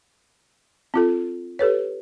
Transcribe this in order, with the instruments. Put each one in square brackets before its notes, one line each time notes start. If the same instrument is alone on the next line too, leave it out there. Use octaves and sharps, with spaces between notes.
[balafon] C4 F4 A4
G4 A4 B4 C#5